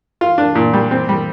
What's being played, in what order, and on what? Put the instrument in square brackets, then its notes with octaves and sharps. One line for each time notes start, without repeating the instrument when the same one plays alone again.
[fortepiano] F4
D4
A#2
G3
C4
G3